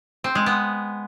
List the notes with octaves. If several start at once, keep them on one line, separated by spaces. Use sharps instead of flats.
C4
G#3
B3